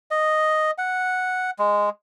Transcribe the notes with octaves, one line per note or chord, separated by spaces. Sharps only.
D#5
F#5
G#3